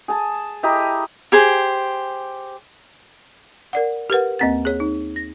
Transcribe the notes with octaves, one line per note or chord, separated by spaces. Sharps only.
G#4 A5
E4 G4 D#5 A#5
G4 G#4 C5
A#4 D5 F#5
G4 A#4 B4 F#5
D#2 A#3 C4 F#5 A6
G#4 C#5
D#4
A#6